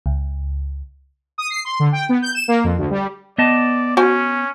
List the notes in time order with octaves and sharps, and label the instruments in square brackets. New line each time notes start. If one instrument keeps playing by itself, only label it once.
[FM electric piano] C#2
[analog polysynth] D#6
C7
C6
D3
G5
B3
G6
E7
A#3
F2
D2
G3
[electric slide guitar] B3 D#5 A5 [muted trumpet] D5
[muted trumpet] C#4 [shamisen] F#4 C5 G#5